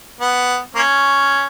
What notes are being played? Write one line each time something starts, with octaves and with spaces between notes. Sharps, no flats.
B3
A#3 C#4